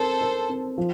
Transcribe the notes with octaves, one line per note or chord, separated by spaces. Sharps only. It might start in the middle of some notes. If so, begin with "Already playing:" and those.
Already playing: C4 A4 A#4 C5
A#4
C4
F3